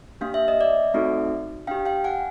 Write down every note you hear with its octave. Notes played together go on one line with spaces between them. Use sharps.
A#3 D4 G4 F5
E5
D#5
D5 E5
A3 C4 D#4 F#4 A4
D4 G4 F5 G5
F5 G5
F#5 G#5